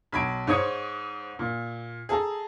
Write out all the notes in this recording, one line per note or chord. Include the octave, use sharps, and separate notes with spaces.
B1 B5 G#6 D7
G#2 C5 C#5 D#6 G#6 C#7
A#2
G#4 A4 A5 A#5